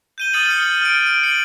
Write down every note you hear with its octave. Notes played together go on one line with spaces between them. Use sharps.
G6 D#7 G7
D#6 F6 A6 C#7 D#7 F#7
F6 C#7 G7
F6 D7
D7 D#7
C#7 F#7